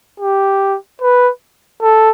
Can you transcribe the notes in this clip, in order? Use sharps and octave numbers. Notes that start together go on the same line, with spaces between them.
G4
B4
A4